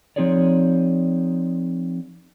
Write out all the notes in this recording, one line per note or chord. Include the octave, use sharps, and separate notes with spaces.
F3 C4 D#4 G#4 C#5 D5